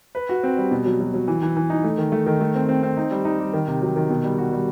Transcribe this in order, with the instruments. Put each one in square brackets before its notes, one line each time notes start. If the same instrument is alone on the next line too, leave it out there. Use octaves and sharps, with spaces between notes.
[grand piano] B4
F#4
C4
G3
B2
F#3
F#3
F#3
E3
E3
E3
D#4
A3
D#3
A3
D#3
A3
C4
C4
C4
D#4
G3
D#4
G3
D#3
C3
F#3
D#3
B2
G3
F#4
G3